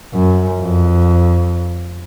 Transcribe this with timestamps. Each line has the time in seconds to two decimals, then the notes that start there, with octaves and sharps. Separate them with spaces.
0.14 F#2
0.60 F2